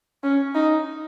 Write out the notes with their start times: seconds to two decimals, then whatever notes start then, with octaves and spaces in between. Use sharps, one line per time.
0.24 C#4
0.55 D#4